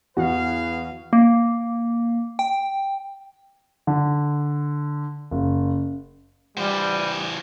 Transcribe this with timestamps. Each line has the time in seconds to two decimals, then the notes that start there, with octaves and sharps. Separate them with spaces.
0.17 E2 B3 F#4 G#4 B4 F5
1.13 A#3
2.39 G5
3.87 D3
5.31 F#1
6.57 E3 G3 C5